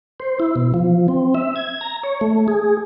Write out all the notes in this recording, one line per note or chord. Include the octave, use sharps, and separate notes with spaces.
C5
E4
B2
F3
C4
E5
G#6
A#5
C#5
A3
G#4